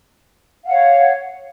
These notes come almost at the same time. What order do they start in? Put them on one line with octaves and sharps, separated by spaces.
F5 F#5 C#5